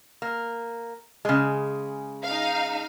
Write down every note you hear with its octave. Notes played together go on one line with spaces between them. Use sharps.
A#3
C#3 G#3
D#4 F5